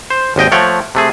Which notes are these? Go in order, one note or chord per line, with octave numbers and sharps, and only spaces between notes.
C5
G#1 D#2 D#5 G5
F3 A3 C#5 F#5 G5
C3 A3 G#4